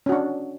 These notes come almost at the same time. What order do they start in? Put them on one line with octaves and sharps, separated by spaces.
C#4 F#4 D4